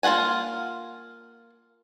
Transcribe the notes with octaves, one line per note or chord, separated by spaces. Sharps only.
A#3 F4 G#4 F#5 G#5